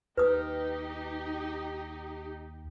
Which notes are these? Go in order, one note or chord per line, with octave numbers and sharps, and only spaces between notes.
D#2 D#4 G4 B4 D#6